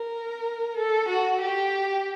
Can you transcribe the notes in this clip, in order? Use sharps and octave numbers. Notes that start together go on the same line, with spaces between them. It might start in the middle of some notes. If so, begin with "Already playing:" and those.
Already playing: A#4
A4
F#4
G4